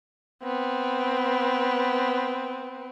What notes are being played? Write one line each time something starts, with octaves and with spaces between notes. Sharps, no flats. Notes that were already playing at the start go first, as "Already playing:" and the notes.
B3 C4